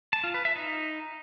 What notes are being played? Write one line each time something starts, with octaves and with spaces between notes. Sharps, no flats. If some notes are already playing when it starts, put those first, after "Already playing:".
A5
F4
B4
E5
D#4